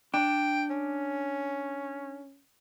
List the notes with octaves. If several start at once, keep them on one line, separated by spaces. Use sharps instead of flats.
D4 G5
C#4